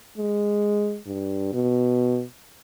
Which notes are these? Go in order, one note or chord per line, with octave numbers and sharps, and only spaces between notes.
G#3
G2
B2